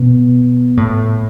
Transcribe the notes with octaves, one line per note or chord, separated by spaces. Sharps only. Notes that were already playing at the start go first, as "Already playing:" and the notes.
Already playing: B2
A2